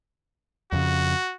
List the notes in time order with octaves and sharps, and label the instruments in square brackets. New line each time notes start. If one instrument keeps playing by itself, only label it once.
[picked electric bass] F2 C#3 [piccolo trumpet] F#4